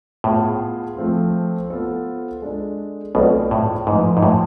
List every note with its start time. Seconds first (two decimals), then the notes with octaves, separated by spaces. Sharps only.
0.24 A2 B3 F4 G#4
0.97 F3 A3 C4 F4
1.70 B3 F4 A4 C5
2.42 G#3 D4 A4
3.15 B1 B2 A3 C4 F4 G#4 D5
3.51 A2
3.87 G#2 F3 A3 E4 B4
4.17 G#2
4.23 A2